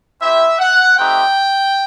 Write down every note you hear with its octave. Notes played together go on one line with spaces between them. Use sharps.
C4 E4 G4 E5
F#5
A3 C4 D#4 G4 G5